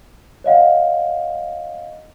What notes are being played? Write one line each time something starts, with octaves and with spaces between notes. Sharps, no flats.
C#5 D#5 F5 F#5